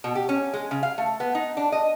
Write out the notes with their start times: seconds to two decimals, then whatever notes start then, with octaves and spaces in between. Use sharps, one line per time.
0.04 B2
0.15 G4
0.29 C#4
0.53 G#3
0.71 C#3
0.83 F5
0.98 A3
1.20 B3
1.35 D#4
1.57 D4
1.72 D#5